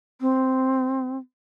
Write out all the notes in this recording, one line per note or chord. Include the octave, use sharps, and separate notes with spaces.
C4